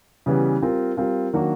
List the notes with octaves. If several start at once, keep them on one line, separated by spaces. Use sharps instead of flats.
C#3 E3 G3 B3
G3 C4 F4 A#4
G3 C4 F4 A#4
D#3 F#3 A#3 D4 F#4